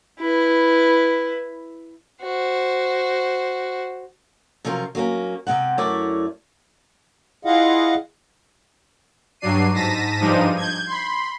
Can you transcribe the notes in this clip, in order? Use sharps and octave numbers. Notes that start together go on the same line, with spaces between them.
E4 B4
F#4 C5
C3 F3 F#3 C#4 F4 A#4
F#3 A#3 C#4
C3 G#3 C4 F#5
F#2 A3 E4 A#4 C#5 D5
E4 F4 G#4 D#5 F5 F#5
G2 F#3 D4 C7 D#7
G#2 A5 A#6 B6 D#7
G2 F3 G#3 D4 D#4 D#7
G6 G#6
B5 C6